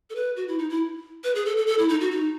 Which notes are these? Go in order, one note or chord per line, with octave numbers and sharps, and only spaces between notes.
A4
B4
F#4
E4
D#4
E4
B4
G#4
A4
A4
A4
E4
D#4
F#4
D#4